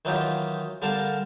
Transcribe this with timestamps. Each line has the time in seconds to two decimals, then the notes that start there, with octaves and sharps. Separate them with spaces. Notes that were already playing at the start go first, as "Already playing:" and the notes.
0.05 D#3 E3 F#3 D#4 F4 G4
0.82 D3 G3 A#4 F5 A5